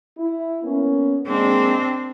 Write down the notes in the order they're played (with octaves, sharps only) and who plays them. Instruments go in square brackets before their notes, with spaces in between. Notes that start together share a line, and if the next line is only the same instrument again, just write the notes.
[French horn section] E4
A#3 B3 C#4
[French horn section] G#3 A#3 [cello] C4 D4